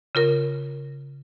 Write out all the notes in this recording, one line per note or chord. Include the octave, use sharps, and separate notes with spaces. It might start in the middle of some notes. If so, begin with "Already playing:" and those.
C#3 F4 A#4